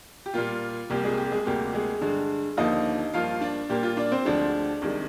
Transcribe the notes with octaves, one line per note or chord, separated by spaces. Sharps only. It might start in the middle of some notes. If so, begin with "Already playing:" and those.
G4
A#2 G3 A#3 F4
C2 C3 G3 A#3 G4
G#3 G#4
G4
G#3 G#4
D2 C3 G3 A#3 G4
G#3 G#4
G2 D3 G#3
D#2 D3 F3 A#3 D#4 D#5
G2 F3 A#3 F4 F5
D4 D5
A#2 G3 A#3 G4
F4
D4 D5
C4 C5
D2 D3 F3 G#3 D4 D5
C2 C3 D#3 G#3